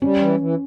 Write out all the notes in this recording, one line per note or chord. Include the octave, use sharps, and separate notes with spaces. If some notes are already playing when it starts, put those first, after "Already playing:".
G3 C#4
E3
E3